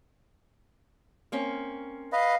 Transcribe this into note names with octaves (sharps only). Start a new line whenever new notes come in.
A#3 C4 C#4
B4 D#5 F5